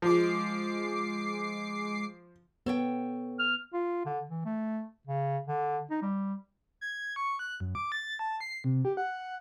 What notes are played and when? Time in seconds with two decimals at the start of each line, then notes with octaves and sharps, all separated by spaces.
0.02 F3 G#3 D6 C7
2.66 B3 A4 C#5 G5
3.39 F6
3.73 F4
4.05 D3
4.29 E3
4.45 A3
5.07 C#3
5.47 D3
5.90 D#4
6.02 G3
6.81 G#6
7.16 C#6
7.39 F#6
7.60 F#2
7.75 D6
7.92 A6
8.19 A5
8.41 C7
8.64 C3
8.85 G4
8.97 F#5